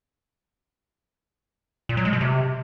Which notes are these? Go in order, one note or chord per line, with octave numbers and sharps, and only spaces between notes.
A#2
F#3
G#3
B2
C3